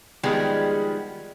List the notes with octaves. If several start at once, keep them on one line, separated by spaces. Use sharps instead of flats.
D#3 F3 G3 G#3 B3 G#4